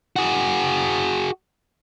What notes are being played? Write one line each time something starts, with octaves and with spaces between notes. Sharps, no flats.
F#4 G#4